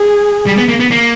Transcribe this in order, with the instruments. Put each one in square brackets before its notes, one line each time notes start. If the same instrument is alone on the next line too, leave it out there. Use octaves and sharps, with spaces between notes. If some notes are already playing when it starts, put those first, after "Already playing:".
Already playing: [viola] G#4
[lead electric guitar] G3
B3
A#3
B3
A#3